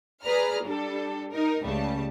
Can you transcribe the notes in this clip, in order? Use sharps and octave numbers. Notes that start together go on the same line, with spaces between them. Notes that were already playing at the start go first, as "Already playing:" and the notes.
G#4 B4 D5 A#5 F6
G3 D4 A4
D#4 A#4
C#2 C#3 G3 A3 A5